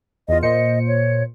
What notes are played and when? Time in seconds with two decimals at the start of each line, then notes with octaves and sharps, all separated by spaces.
0.28 E2 F4 D#5
0.42 A#2 C5 D#5 C#7
0.87 C#5